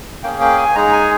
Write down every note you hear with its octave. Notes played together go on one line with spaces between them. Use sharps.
A#3 C#4 G#4 G5
G5
G#5
G#3 D#4 G#4 A#5
G#5